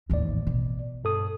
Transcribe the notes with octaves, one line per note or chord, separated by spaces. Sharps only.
A1 D#2 G#2 D5
B2
G2 A4 D#6